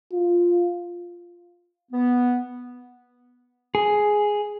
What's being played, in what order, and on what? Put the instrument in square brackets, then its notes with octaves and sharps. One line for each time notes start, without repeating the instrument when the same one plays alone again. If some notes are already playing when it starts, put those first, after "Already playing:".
[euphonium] F4
[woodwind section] B3
[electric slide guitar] G#4